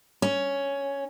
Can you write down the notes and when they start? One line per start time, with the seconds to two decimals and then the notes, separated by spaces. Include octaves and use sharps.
0.22 C#4